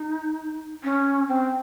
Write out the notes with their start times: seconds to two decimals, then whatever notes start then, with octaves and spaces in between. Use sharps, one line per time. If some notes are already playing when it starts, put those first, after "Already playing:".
Already playing: D#4
0.84 C#4
1.28 C4